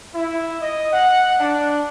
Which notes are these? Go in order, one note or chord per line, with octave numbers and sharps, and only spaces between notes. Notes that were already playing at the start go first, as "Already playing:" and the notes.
E4
D#5
F#5
D4